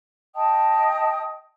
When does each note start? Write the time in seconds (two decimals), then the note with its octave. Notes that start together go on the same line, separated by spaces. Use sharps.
0.36 D#5 G5 A5 D#6